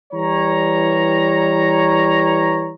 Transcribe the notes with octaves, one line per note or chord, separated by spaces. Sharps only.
E3 G3 C#5 A#5